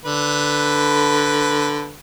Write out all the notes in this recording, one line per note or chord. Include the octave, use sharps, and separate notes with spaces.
D3 B4